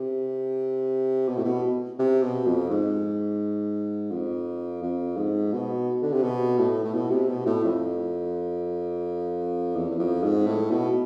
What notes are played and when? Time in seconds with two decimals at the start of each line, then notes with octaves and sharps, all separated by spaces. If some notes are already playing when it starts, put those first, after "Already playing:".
Already playing: C3
1.28 B2
1.37 A2
1.44 B2
1.99 C3
2.23 B2
2.47 F2
2.70 G#2
4.11 F2
4.82 F2
5.17 G#2
5.53 B2
6.02 D3
6.13 C3
6.23 B2
6.58 A2
6.84 A2
6.94 B2
7.11 C3
7.29 B2
7.46 A2
7.64 F2
9.76 E2
9.91 E2
9.99 F2
10.23 G#2
10.47 A2
10.71 B2